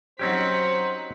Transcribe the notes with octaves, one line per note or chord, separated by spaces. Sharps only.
F#3 C4 C#4 D#4 G4 C5 F#5 B6